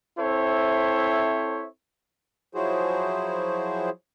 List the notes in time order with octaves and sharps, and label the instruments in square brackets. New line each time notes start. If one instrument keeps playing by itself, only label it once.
[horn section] C4 E4 A4 C5 C#5 E5
[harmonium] F3 F#3 E4 F#4 G#4 C5